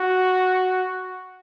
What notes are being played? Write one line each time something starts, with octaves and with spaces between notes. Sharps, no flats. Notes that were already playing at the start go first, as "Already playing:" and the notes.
Already playing: F#4